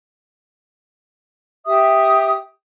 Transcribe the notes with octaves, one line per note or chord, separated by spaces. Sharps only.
G4 E5 D#6